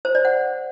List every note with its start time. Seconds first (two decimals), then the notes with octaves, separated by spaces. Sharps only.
0.05 C5
0.15 D5
0.25 F#5